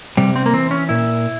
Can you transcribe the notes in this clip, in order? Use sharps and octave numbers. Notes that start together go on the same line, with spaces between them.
C3 G3
C4
A#3
E3 C4
C#4
A#2 E4